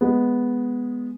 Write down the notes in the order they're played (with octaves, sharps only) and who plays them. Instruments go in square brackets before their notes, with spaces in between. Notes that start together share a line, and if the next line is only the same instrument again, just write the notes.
[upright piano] G#3 B3